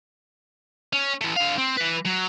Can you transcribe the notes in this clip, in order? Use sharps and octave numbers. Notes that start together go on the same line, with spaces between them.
C#4
E3 A3
D3 F5
C4
E3 B4
F#3